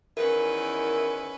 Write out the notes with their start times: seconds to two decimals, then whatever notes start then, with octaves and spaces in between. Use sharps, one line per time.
0.17 E2 D#3 C#4 E4 A#4 B4